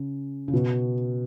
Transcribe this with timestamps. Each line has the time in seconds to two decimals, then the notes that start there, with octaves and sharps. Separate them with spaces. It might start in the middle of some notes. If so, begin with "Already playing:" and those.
Already playing: C#3
0.48 C#3
0.53 B2